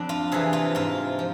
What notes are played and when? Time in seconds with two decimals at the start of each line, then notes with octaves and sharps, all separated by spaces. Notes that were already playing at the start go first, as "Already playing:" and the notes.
Already playing: F2 D4
0.09 F4
0.32 C3 E3 G#4
0.53 F4
0.75 G#2 F4
1.19 F3